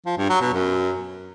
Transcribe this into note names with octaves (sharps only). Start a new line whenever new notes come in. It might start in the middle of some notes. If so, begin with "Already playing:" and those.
F3
G2
F#3
B2
F#2